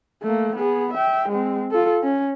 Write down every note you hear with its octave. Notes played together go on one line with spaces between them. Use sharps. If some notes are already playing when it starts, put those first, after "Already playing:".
A3 A#3
B3 G#4
E5 G5
G#3 C4
F4 A4
C#4